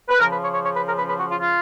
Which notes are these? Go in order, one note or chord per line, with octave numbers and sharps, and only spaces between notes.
B4
C#3 F3 A#4
B4
C#5
C#5
C#5
B4
A#4
B4
B4
F#4
F4
F4